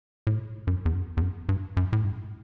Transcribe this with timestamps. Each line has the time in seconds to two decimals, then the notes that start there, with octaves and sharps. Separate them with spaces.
0.27 A2
0.67 F#2
0.85 E2
0.94 F#2
1.17 E2
1.22 F#2
1.49 G2
1.77 F#2
1.93 A2
2.04 G2